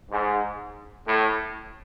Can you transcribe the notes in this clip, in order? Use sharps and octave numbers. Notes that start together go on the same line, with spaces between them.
G#2
A2